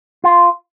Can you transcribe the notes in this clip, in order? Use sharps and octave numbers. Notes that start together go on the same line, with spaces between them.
F4